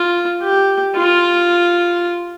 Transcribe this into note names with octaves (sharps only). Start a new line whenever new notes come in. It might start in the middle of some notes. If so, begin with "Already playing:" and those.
Already playing: F4
G4
F4